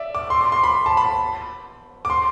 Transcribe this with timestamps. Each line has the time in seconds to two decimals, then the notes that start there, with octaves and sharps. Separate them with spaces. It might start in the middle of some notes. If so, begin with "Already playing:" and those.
Already playing: D5 E5
0.15 D6
0.30 C6
0.41 D6
0.52 C6
0.63 B5
0.86 A5
0.97 B5
2.05 D6
2.10 C6